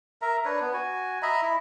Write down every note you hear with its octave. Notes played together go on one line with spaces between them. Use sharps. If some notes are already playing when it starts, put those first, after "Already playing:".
A#4 E5 A#5
D4 B4 C#5
B3
F#4 G#5
D#5 E5 A#5 B5
E4